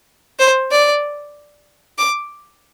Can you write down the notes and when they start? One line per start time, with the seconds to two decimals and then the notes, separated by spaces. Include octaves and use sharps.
0.39 C5
0.71 D5
1.98 D6